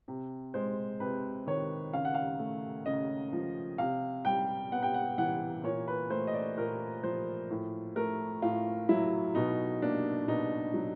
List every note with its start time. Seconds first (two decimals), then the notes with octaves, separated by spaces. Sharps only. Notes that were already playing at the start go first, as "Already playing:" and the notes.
0.08 C3
0.54 G#3 C5
1.00 C3 B4
1.47 D#3 C#5
1.93 C#3 F5
2.05 F#5
2.14 F5
2.39 A3
2.86 C#3 D#5
3.33 F3
3.78 C3 F5
4.25 G3 G5
4.71 B3 F#5
4.83 G5
4.94 F#5
5.18 E3 F#5
5.64 A#2 C#5
5.88 B4
6.10 A3 C5
6.27 D#5
6.34 D5
6.58 A#2 A#4
7.03 F3 C5
7.50 A2
7.96 A3 A#4
8.42 A2 F4
8.89 F#3 E4
9.35 B2 D#4
9.82 A#3 D4
10.28 B2 D#4
10.74 F#3